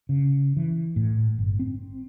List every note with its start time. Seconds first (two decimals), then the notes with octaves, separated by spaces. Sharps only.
0.09 C#3
0.57 E3
0.96 A2
1.39 G1
1.59 C4